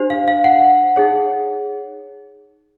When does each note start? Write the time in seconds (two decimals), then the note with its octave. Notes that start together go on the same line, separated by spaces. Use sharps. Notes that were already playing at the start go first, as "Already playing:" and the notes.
Already playing: D4 G4 C5
0.10 F5
0.28 F5
0.44 F#5
0.96 D#4 G#4 C#5